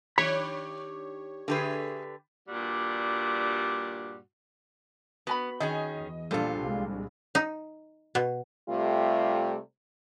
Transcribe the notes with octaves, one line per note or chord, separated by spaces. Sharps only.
D#3 D4 G4 C#5 B5
D3 A3 G4 G#4 B4
G2 A#2 G3 F#4
B3 F#4 G#5 B5
D#3 C#4 G#4 D#5
E2
A#1 A#2 G3 D4 F4 A4 C5
C2 G#3
D#4
B2
C3 G3 A3 F4